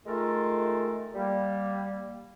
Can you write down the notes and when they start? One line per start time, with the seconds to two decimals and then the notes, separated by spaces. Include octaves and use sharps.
0.05 D#3 G#3 A3 F4 A4 A#4
1.14 G3 A#3